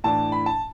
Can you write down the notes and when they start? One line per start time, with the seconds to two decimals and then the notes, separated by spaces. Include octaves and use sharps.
0.04 A2 E3 D4 A5
0.32 B5
0.46 A5